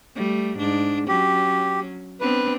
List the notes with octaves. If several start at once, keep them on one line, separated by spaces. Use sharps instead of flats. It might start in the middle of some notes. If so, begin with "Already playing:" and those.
G3 A3
G#2 D4
F#3 C#4 G4
B3 C4 D4 B4